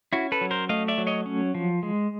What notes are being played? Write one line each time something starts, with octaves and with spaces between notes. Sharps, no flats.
C#4 E4 F#4
A4 B4
F#3
A#4 C5
A3 D#5 F5
D5 E5
F#3
C#5 D#5
C#4
F3
G#3